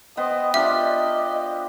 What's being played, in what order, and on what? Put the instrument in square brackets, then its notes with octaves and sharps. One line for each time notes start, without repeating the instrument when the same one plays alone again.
[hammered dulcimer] B3 C5 G5 [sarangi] D#5
[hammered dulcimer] D4 F4 G4 [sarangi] D#5 [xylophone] E5